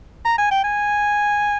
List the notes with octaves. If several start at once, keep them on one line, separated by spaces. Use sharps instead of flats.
A#5
G#5
G5
G#5